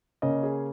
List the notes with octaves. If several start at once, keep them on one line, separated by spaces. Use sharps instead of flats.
C#3 A#3 C#4 D#5
G#4